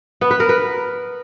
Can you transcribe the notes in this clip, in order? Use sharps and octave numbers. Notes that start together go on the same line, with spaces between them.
B3
B4
A#4
B4